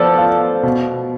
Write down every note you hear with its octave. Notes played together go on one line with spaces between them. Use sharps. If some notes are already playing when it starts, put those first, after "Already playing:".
Already playing: F3 B3 A4 D5
F4
B2